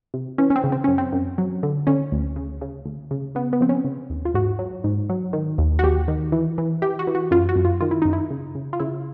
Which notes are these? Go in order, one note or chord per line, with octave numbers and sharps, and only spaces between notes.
C3
E3 C#4
C#4
C4
C#3
C4
F#2 C#4
C4
F#2
F#3
D3
D3 C#4
D2
C#3
C#3
D2
C#3
C#3 B3
B3
F3 C4
C#4
C#3
D#2
F4
G#2 F#4
F#3
G#2
F#3
D#3
D#2
F#4
D#2 G4
D#3
E3
E3
E3 G4
F#4
E3
F#4
F#2 F4
F#4
F#2
F4
D#3 F4
E4
F#2 D#4
E4
C#3
C#3
F4
C#3 E4